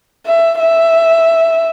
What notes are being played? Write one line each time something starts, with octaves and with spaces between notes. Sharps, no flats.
E5
E5